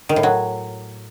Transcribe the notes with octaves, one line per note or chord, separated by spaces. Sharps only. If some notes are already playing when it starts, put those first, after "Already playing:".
D#3
A2
F#3